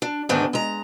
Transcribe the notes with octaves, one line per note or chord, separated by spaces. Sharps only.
D4
D2 G#2 D#3 B3 D4
G#3 A#5